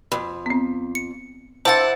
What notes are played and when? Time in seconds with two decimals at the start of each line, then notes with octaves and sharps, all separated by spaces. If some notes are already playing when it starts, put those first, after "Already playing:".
0.12 F2 B5
0.46 B3 C4
0.95 C#7
1.65 D4 E4 F4 A4 C5 F#5 A6